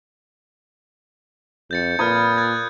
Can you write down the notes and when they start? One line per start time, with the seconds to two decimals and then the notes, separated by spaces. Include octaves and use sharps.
1.71 F2 G6 A6 C#7
1.99 A#2 B4 B5 D#6 F6 G#6
2.38 F#6 G#6 A6